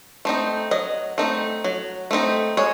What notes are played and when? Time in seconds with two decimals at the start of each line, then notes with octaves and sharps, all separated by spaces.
0.25 A3 C4 D#4
0.71 F#3 D#5
1.18 A3 C4 D#4
1.64 F#3
2.11 A3 C4 D#4
2.57 G#3 C#5